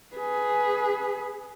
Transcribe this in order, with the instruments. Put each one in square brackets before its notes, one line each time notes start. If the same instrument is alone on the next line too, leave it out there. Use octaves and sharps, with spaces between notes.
[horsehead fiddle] G#4 B4